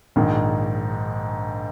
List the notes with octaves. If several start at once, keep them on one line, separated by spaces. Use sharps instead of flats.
A#1 G#2 D#3